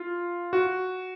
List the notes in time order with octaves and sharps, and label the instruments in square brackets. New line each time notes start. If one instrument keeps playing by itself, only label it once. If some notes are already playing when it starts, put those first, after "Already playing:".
Already playing: [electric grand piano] F4
F#4